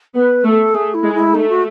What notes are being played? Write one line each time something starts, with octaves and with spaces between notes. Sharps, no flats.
B3 B4
A3 A4
A3 G#4
E4
G#3
E4
A3 D#4
F#4